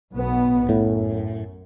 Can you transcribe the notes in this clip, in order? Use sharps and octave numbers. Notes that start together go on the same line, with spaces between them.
B1 B2 B3
F#2 A2